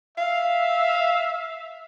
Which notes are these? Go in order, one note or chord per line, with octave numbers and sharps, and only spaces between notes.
E5 F5